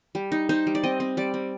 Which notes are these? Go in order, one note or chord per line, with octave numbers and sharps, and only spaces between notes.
G3
D#4
D#4 C5
G3
D5
C4 D#5
C4
G3 D5
C4